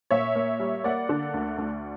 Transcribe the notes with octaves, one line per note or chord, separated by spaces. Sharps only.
A#2 C#5 E5
A#3
G3
A#3 D5 F#5
D3
D2
D2